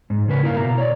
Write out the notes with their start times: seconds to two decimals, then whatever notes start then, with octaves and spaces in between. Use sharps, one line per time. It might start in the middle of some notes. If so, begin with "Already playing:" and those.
0.10 G#2
0.28 C#3 A#3 B4
0.43 E4 A#4 F5
0.56 B2 A#5
0.78 C#5 D5